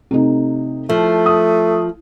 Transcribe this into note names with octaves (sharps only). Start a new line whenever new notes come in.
C3 A3 D#4
F3 A3
D#6